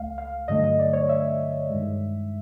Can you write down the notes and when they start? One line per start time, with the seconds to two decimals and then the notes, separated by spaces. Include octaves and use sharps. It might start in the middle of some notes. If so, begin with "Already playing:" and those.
Already playing: C#2 A3 F5
0.18 F5
0.48 G2 D3 F#3 A3 D#5
0.64 D#5
0.79 D5
0.93 C#5
1.09 E5
1.70 G2 D#3 G#3